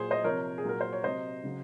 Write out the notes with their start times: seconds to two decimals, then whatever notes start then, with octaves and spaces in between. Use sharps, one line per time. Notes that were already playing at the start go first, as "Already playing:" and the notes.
Already playing: A#2 F#3 G#4 C5
0.11 C5 D#5
0.24 C3 F3 A#4 C#5
0.58 G#4
0.64 A#2 F#3 A#4
0.81 C5
0.93 C#5
1.04 C3 F#3 C5 D#5
1.43 C#3 F#3